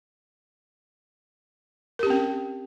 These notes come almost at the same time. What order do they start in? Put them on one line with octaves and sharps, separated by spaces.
A#4 G4 C#4 C4